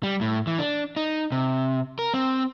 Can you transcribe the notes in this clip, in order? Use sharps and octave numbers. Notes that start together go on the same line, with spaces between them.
G3
A2
E3
D4
D#4
C3
A#4
C4